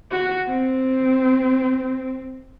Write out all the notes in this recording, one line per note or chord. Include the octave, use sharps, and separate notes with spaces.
F#4
C4